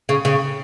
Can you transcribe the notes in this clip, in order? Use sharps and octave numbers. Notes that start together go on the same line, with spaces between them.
C#3
C#3